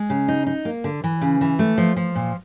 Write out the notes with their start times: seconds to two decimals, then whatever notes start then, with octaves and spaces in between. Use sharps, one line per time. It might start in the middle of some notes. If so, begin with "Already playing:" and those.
Already playing: G#3
0.10 C#3
0.28 D#4
0.47 D#4
0.65 A#3
0.84 D3
1.04 E3
1.21 C#3
1.41 E3
1.59 A3
1.78 F3
1.96 F3
2.15 A#2